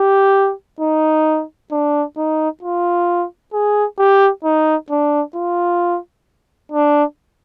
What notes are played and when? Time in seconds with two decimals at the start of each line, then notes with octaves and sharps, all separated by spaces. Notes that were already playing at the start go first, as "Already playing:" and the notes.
Already playing: G4
0.80 D#4
1.72 D4
2.17 D#4
2.62 F4
3.53 G#4
3.99 G4
4.44 D#4
4.90 D4
5.35 F4
6.72 D4